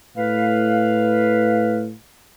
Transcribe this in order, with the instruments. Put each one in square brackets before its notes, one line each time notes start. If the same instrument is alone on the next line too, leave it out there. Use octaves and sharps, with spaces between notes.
[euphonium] A2 [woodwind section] B4 F5